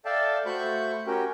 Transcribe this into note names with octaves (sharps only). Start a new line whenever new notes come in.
A4 D5 E5 F5 G5 A5
A3 F#4 C5 B5 C#6 G6
C#4 F#4 G4 A#4 G5